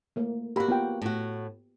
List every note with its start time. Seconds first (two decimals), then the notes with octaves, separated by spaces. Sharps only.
0.16 A3 A#3
0.56 A#3 F#4 G4 B5
0.68 B3 F4 G5
1.02 A2 F#4